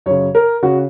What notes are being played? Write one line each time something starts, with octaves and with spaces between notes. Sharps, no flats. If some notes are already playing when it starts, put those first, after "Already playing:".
F#2 C#3 C#5
A#4
C#3 F#4